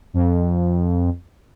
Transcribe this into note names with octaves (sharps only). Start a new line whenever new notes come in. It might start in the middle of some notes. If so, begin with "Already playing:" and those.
F2